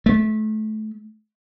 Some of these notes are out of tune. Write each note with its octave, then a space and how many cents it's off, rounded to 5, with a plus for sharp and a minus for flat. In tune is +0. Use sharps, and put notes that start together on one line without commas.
A3 -25